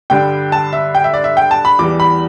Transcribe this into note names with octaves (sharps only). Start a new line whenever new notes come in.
G2 D3 G3 G5
A5
E5
G5
E5
D5
E5
G5
A5
B5
E2 E3 G3 D6
B5